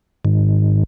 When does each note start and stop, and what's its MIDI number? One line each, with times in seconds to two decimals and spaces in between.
0.25 0.83 44
0.25 0.83 51